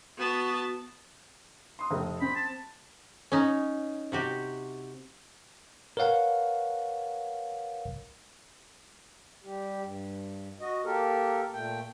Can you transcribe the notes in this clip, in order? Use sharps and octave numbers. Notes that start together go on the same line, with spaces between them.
B3 F#4 A5
C6 D#6
F1 A3
C4 B5
A5
C#4 D#4
C3 F#4 G4
A#4 B4 C#5 F5 F#5
G3 G4
G2
F#4 D#5
A#3 G4 A4 A#4
A#2 A3 G5